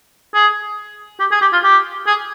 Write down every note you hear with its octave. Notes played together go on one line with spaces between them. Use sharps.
G#4
G4
G#4
G4
F4
G4
G#4